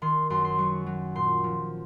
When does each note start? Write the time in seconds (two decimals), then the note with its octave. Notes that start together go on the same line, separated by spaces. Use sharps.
0.02 D#3 C6
0.30 F#2 C6
0.45 C6
0.58 F#3 C#6
0.86 F#3
1.15 A#2 C6
1.44 F3